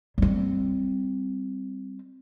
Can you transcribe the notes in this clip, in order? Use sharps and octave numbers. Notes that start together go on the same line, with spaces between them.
G3 C4